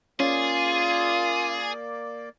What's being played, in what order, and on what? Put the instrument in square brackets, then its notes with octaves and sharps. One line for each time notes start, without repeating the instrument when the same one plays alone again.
[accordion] A#3 D5 [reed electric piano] C#4 [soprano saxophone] F4 [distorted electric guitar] G#4